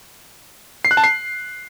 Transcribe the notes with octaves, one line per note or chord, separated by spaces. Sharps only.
C7
F#6
A5
C7